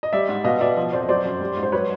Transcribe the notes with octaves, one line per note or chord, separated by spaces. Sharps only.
D#5
G3 D5 E5
G#2
B2 D#5 F5
B2 D5 E5
F3
F2 C5 D5
D#5
F#3 C5 D5
F#2
G3
G#2
C5
F#3 B4 C#5